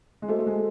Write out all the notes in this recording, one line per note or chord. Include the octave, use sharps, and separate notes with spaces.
G#3
A3 F#4 A4 C5 D#5
A3
G#3